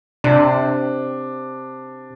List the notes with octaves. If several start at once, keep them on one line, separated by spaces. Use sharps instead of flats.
C3 D4